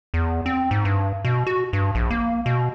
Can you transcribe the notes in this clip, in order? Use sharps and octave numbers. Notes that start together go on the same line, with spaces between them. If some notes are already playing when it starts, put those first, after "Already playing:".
E2
C4
G#2
G2
B2
F#4
G2
A#1
A#3
B2